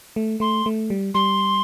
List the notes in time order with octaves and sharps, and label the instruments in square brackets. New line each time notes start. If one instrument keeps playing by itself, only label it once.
[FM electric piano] A3
[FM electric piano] A3 [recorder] C6
[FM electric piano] A3
G3
[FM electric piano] G3 [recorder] C6